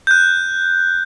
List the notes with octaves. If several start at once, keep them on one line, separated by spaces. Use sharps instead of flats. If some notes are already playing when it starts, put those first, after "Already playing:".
F#6 G6